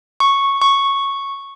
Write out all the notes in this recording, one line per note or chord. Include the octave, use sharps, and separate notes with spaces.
C#6
C#6